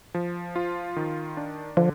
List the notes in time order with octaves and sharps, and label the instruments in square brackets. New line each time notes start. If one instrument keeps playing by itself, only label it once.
[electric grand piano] F3
F4
D#3
D4
[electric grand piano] D3 [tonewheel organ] F3